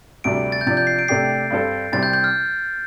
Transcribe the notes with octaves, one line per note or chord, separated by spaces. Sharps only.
D2 C3 G3 D4 D7
A6
G6
C3 F3 D4 A6
G6
C7
D7
C3 A3 D4 G4 C7
G2 G3 C4 A4
C2 C3 G3 C4 G4 A6
G6
G6
F6